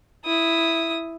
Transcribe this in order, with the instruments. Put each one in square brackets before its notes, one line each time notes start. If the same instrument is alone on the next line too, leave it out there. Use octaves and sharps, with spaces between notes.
[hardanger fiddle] E4 D#6